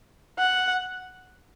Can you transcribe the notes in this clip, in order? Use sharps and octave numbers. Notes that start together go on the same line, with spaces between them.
F#5